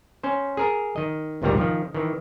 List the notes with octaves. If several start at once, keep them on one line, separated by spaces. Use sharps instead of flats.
C#4 C5
G#4 A#4 A#5
D#3 D#5
G#1 D2 A#2 D#3 G3 A#5
D#3 F3
D#3 E3